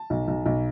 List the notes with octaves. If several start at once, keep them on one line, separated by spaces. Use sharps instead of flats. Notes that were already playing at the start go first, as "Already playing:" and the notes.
Already playing: A5
B1
B1
B1